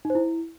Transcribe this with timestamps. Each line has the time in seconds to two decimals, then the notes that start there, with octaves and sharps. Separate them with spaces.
0.05 D#4
0.10 C5
0.15 E4